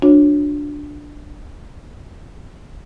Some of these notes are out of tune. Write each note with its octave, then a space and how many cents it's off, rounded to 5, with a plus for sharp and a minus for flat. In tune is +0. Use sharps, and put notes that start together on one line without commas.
D4 +0 F#4 -40 C#5 -20